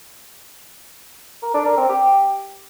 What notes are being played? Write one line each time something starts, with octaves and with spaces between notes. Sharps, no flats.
A#4
D4
A#4
C4
G4